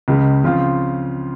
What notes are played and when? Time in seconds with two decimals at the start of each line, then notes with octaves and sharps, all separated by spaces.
0.08 C#2 C#3 G#3
0.44 C#3 F3 C4 F4